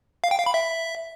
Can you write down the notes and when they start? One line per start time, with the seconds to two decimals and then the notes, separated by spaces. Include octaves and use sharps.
0.24 F5
0.31 G5
0.39 F5
0.46 B5
0.54 E5